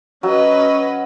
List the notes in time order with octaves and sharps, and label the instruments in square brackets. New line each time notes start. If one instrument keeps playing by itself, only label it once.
[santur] F#3 [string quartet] C#4 B4 D#5